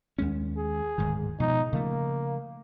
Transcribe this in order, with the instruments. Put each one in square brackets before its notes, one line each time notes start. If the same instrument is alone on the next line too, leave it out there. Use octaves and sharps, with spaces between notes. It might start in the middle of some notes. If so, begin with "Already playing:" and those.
[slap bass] D#2 G#3 C#4
[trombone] G#4
[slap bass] D1 G#2 D#3
[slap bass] B2 F3 G#3 [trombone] D#4
[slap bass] C#3 F3 A3 [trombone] A#3